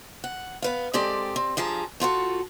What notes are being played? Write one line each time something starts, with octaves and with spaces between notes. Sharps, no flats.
F#5
B3 B4 F5
G#3 C4 G4 A4 D5
C4
G2 F3 G#4 A5 A#5
A3 F4 F#4 A4